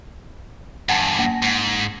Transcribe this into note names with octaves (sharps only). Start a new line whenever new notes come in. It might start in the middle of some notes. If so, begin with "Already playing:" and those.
E2 G2 F#5 G#5 A5
A#3 A#6
G#2